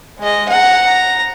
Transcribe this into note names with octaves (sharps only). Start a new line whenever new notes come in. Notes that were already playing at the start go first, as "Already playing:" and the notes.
G#3 D#5
F#5 A#5
A#5